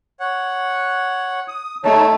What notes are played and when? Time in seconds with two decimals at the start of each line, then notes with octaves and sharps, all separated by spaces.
0.20 C#5 F#5
1.48 D#6
1.84 A3 D#4 C#5 A5